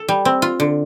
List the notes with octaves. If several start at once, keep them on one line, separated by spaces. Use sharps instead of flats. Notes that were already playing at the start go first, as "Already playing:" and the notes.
Already playing: A4
G3
C4
F4
D3